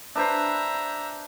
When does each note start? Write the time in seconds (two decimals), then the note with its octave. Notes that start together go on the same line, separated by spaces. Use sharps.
0.15 D4 B4 C5 E5 A#5